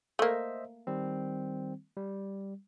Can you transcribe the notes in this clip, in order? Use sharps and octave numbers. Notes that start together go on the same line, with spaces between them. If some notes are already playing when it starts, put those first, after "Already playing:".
A3 A#3 C5 D#5 E5
D#3 G3 C4
G3